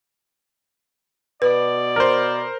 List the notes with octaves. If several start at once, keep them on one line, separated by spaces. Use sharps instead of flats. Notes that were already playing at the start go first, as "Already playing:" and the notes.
B2 B4 D5
A#4 C5